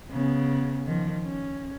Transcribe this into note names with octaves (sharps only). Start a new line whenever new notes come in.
C#3 B3
D#3 F3
C#4